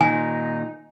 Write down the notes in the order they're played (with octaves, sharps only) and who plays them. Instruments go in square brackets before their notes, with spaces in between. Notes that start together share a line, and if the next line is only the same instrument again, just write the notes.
[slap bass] A#2 D#3 [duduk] D#4 [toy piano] G#5